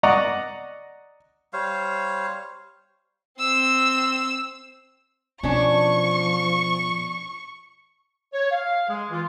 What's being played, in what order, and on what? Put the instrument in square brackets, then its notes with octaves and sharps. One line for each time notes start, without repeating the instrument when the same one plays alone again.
[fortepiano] D5 D#5 F#5 A#5 C#6
[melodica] G3 C5 C#5 F5
[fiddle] C4 E6
[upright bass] B2 [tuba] F3 [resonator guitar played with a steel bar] C#4 D4 [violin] C#6
[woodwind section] C#5
F5
G#3 G#4
E3 F4